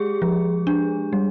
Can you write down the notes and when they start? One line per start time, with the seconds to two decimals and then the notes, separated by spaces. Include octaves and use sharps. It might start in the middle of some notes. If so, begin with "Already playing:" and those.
Already playing: G#3 G4 G#4
0.22 F3
0.67 D4
1.13 G3